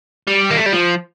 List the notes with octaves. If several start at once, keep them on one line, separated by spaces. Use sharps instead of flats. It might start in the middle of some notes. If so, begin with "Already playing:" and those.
G3
A#3
A3
G3
F3